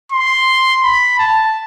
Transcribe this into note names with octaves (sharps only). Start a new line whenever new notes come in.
C6
B5
A5